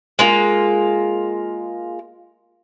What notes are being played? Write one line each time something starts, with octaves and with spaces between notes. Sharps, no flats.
G#3 A#3 F4